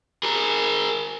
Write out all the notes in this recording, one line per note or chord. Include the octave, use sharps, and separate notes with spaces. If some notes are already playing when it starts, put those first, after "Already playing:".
G#4 A#4